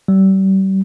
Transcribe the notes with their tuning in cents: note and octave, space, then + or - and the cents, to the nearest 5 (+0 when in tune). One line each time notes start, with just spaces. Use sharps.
G3 -35